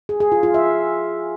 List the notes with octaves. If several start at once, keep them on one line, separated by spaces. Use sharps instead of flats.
G#4
G#4
F4
F4
E5